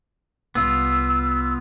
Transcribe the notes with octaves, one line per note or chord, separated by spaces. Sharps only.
C2 B3 F4 E6